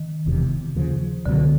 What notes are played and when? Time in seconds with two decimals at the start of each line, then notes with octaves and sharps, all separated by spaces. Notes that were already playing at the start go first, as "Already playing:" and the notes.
Already playing: D#3
0.26 E1 E2 C3
0.75 D#2 C#3 F3
1.26 C#2 B2 D3 F#3